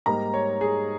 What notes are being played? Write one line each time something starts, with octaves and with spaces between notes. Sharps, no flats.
G#2 G3 A#3 D#4 A#5
C#5
G#4